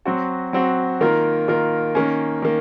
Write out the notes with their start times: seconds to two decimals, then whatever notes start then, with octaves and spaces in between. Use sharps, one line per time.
0.06 F#3 C4 F#4
0.53 F#3 C4 F#4
1.01 D#3 A#3 F4 A#4
1.48 D#3 A#3 F4 A#4
1.95 D#3 A#3 C#4
2.42 D#3 A#3